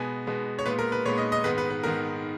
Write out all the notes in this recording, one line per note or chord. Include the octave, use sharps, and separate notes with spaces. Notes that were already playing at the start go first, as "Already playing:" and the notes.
Already playing: B2 G#3 B3 G#5
B2 G#3 B3
C#5
A#2 G#3 B3 B4
A#4
B4
A#2 G#3 B3 C#5
D#5
D#5
G#2 D#3 G#3 B3 B4
B4
B4
G#2 D#3 G#3 B3 A#4